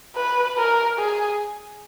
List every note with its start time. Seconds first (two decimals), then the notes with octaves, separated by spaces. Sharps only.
0.16 B4
0.57 A#4
0.99 G#4